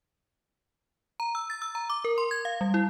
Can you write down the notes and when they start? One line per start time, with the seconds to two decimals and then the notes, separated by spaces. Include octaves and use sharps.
1.20 A#5
1.35 E6
1.50 A6
1.62 E6
1.75 A#5
1.90 D6
2.05 A#4
2.18 C6
2.31 G#6
2.45 F5
2.61 G3
2.74 E4